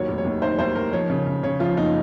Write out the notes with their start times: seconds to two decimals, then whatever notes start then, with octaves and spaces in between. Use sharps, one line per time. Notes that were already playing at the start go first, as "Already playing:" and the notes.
Already playing: D#2 F#3 C#5
0.08 F1
0.18 C#5
0.25 D#2
0.42 D#3 C5
0.59 D#2 C5
0.75 D#3 A#4
0.92 F3 C#5
1.10 C#3
1.27 C#3
1.43 C#3 C#5
1.60 F3 F4
1.77 F#1 D#4